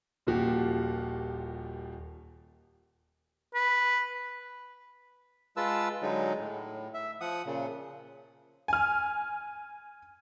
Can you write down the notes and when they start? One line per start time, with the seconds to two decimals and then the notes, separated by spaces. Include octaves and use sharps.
0.27 D#1 A#2 F3 F#4 G4
3.55 B4
5.57 G#3 F4 B4 A5 E6
6.02 D3 F#3 G#3 D#4
6.39 A2
6.94 E5
7.21 F3 F#5 D#6
7.46 A#2 C#3
8.68 G#5 F6